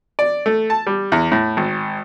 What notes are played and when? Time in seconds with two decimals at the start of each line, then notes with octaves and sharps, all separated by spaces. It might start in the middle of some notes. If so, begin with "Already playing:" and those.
0.19 D5
0.46 A3
0.70 A5
0.87 G3
1.12 E2
1.32 A2
1.57 G#1